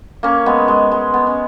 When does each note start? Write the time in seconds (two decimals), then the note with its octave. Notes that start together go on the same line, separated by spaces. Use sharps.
0.23 A#3 C#4
0.46 G#3 B3
0.68 G#3
0.91 G#3
1.14 B3
1.27 C#4